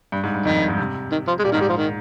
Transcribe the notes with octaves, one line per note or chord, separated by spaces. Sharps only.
G2
G#2
G2
F2 D#3
G2
G#2
C3
D#3
F3
G#3
A#2 G3
D#3
G#2
G3
F3
D#3